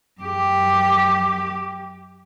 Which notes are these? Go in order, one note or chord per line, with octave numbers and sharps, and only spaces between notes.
F#2 G4